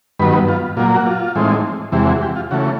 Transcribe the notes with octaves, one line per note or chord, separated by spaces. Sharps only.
G2 D#3 F#3 B3 B4
F4
A#2 F#3 A#3 F4
F#4
F4
A2 E3 G#3 C4 D#4
E2 C3 E3 G#3 G4
F#4
G4
F4
C#3 E3 A3 F#4